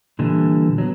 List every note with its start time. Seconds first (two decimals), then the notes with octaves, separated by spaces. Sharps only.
0.19 A#2 D3 E3 G3
0.78 F#3 B3